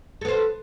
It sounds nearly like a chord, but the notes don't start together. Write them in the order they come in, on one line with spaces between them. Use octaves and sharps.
A4 B3 C5